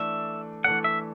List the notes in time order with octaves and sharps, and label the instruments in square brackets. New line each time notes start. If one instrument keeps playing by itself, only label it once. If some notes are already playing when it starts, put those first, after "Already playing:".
Already playing: [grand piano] E3 A3 D4 A4 D5 [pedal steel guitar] E5
[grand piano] E3 A3 D4 A4 D5 [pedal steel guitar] F#5
[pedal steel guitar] E5